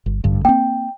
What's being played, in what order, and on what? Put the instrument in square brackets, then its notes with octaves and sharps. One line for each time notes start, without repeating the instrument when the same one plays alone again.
[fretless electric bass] G1
A1 G2 D3
[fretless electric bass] A#3 C4 [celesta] G5